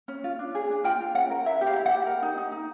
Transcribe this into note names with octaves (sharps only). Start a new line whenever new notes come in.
C#4
F4
D4
G#4
D4
F4 G5
F4
C#4 F#5
A#4
E4 E5
G4
F5
E4
F#5
G4
A#4
D#4
D#4
D#4